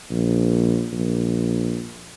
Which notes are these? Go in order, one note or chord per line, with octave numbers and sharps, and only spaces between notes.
A#1
A#1